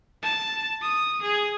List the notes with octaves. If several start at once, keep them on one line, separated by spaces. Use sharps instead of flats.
A5
D#6
G#4